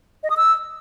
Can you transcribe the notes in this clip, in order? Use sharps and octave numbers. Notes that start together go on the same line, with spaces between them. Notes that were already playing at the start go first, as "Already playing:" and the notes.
D#5
D#6
E6